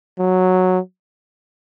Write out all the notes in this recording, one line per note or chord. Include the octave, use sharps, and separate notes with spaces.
F#3